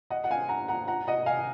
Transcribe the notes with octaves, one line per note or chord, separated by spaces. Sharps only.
D#5 F#5
F#5
F5 G#5
F#5 A#5
F#5 A#5
F#5 A#5
D#5 F#5
F5 G#5